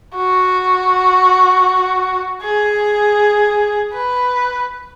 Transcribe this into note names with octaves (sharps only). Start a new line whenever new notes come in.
F#4
G#4
B4